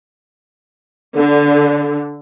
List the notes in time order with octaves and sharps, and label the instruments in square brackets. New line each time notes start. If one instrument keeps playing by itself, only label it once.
[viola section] D3